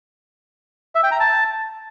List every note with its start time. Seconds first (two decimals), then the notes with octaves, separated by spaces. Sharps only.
0.95 E5
1.03 G5
1.11 A#5
1.20 A5